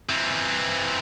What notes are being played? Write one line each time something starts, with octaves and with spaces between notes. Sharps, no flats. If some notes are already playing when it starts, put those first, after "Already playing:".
E3 C4